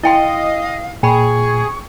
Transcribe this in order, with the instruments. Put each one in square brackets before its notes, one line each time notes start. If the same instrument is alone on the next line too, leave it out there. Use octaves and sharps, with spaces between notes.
[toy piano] E4 G5 C6 [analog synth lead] D#5 [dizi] F5
[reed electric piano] A#2 [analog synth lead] G#4 [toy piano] G5 B5 [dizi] C#6